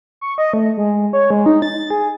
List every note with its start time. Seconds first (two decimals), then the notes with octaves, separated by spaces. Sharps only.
0.21 C#6
0.38 D#5
0.53 A3
0.77 G#3
1.13 C#5
1.31 G#3
1.46 D#4
1.62 A6
1.90 G#4